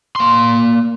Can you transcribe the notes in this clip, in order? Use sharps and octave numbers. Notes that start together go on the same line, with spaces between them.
A#3 C6